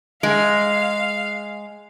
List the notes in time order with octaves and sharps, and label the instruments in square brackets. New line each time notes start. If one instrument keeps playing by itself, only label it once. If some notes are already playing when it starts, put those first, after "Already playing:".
[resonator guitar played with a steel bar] G#3 [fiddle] F5